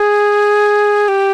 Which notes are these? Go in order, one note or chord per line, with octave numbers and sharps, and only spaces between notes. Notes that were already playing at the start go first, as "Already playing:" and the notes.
Already playing: G#4
G4